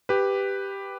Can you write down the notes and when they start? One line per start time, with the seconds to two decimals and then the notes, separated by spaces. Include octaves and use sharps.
0.09 G4 B4